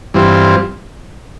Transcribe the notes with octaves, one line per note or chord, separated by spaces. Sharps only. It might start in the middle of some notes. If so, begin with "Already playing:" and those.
G2 E3 G3 C4 F4